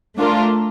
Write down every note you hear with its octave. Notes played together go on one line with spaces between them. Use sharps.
A3 D4 F4 A#4